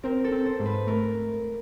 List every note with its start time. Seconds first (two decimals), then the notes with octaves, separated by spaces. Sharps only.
0.03 C4 A#4
0.24 A4
0.32 C4
0.45 C5
0.59 G#2
0.66 B4
0.87 A3 A#4